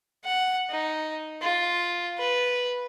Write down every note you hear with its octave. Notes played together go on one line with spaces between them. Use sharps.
F#5
D#4
F4
B4